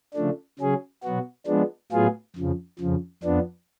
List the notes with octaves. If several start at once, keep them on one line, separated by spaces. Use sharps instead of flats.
C#3 F3 A3 D4
C#3 F#3 C#4 G#4
B2 F#3 B3 F#4
F3 G#3 B3 D4
A2 F#3 B3 F4 G#4
F2 C#3 F3
F2 C#3 F3
F2 F3 B3 D4